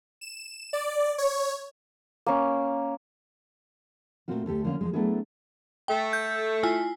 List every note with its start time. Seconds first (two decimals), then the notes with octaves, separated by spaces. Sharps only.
0.21 E7
0.73 D5
1.18 C#5
2.26 A#3 C#4
4.28 A#2 C#3 A3 C4 F4 F#4
4.46 D2 A3 G4 A4
4.64 D3 F3 A#3 C#4 F4
4.81 F3 F#3 G#3
4.93 F#3 A3 B3 D4 E4 G#4
5.88 A3 A4 G5
6.13 G6
6.63 E4 F4 G#5